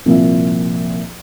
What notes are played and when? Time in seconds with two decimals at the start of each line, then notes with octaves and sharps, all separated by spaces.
0.06 C2 A#2 F3 F4 E5